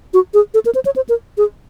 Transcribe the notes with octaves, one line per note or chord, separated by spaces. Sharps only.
F#4
G#4
A4
A#4
C5
C#5
C5
A#4
G#4